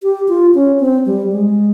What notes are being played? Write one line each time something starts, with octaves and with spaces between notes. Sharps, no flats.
G4
F4
C#4
C4
G3
G#3